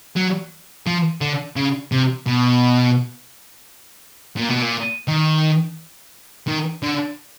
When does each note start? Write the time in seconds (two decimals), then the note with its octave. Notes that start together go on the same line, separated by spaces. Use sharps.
0.16 F#3
0.87 F3
1.21 D3
1.56 C#3
1.92 C3
2.27 B2
4.37 A#2
4.50 B2
4.63 A#2
5.08 D#3
6.47 D#3
6.83 D3